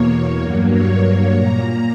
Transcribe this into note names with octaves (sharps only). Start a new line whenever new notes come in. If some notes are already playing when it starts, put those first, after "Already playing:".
Already playing: E2 B2 A#3 C#5
G2 F#3 A#3
C#5
C#5
A#2 A#3 A#5